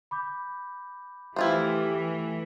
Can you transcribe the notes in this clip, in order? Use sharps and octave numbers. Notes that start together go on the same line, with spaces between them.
B5 D6 G6
E3 A3 E4 F4 G4 C5 E5